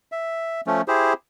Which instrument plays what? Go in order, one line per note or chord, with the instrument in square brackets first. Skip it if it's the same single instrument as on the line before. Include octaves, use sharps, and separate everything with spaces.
[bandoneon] E5
F3 A3 C#4
E4 G4 G#4 C5